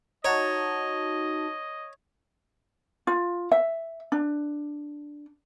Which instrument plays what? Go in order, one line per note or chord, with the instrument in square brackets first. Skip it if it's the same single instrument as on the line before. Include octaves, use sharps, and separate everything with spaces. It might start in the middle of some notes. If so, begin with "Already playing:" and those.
[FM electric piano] D#4 F#4 A5 [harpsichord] C#5 [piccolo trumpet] D#5
[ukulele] F4
E5
D4